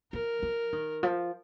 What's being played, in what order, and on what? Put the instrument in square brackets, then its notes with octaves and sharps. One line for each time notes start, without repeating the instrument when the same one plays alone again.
[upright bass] F3 [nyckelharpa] A#4
[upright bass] F3
D#3
F3